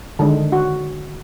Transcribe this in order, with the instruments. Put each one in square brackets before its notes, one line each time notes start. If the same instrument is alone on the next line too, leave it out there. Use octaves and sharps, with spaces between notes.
[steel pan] D3 D#3 G#3
F#4